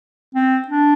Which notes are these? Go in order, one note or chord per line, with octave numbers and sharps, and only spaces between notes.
C4
D4